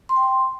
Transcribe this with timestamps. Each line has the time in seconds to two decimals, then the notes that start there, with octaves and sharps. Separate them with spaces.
0.09 C6
0.16 G5
0.23 C6